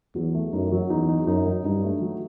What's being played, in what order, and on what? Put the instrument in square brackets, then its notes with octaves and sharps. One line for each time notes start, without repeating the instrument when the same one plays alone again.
[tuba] E2 [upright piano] F#3
[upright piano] A3
[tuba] F#2 [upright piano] D#4
[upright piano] F#3
[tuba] E2 [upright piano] D#4
[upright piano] D#4
[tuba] F#2 [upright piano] D#4
[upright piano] F#3
[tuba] G2 [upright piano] D#4
[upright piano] A3
F#3